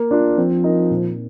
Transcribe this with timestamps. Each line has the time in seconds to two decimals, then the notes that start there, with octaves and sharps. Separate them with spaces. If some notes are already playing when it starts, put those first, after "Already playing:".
Already playing: A#3
0.11 D4 F4
0.37 F3 C4
0.64 D#4 A#4 D#5
0.91 A#2